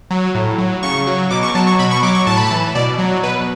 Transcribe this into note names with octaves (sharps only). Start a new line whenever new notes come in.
F#3
A2
F#3
C#3 C#6
F#3
B2 D6
C#6
F#3 A5
C#6
B2 B5
C#6
F#3 D6
C#6
A2 A5
B5
A5
E3
B2 D5
F#3
B2 B4